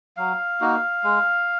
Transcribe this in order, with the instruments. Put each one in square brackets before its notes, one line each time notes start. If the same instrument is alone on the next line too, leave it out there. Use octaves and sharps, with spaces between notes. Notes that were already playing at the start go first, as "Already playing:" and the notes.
[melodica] F#3 F5
A#3 D#4 F#4
G#3